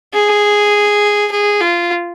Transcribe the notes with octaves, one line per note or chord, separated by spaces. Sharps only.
G#4
G#4
F4